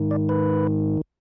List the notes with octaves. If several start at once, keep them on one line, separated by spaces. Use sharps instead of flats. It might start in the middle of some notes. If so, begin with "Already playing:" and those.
Already playing: G#2 D#3
D5
B4